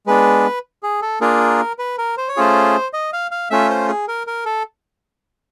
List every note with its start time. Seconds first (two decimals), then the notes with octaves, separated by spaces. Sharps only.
0.07 G#3 B3 D4 B4
0.83 G#4
1.02 A4
1.21 A#3 D4 F4 G#4 A#4
1.79 B4
1.98 A#4
2.17 C5
2.29 C#5
2.37 A3 C#4 F4 G#4 C5
2.93 D#5
3.13 F5
3.31 F5
3.50 A3 C#4 F4 E5
3.69 C5
3.88 G#4
4.08 A#4
4.27 A#4
4.46 A4